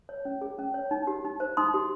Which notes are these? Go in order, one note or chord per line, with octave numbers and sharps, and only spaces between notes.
C#5
C#4
G#4
C#4
C#5
D#4
G4
D#4
C5
D#4 C6 D#6
G4